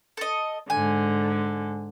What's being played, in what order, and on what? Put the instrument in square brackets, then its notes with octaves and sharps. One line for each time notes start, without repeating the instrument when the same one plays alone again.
[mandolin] A4 D#5
[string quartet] G#2 D3 [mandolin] G#5